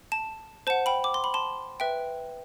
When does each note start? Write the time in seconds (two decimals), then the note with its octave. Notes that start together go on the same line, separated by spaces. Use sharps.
0.12 A5
0.67 C5 F#5 A5
0.86 G5 B5
1.04 D6
1.14 C6
1.24 B5
1.34 A5 C6
1.80 B4 E5 G5